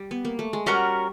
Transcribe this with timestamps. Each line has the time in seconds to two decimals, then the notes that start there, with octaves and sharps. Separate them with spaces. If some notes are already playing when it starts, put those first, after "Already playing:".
Already playing: G3
0.11 B3
0.25 A#3
0.39 A3
0.53 G#3
0.66 G3 C#4 F#4 A#4